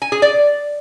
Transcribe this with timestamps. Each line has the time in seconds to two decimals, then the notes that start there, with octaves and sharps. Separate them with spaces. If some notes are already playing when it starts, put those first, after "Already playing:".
0.02 G#5
0.12 G#4
0.22 D5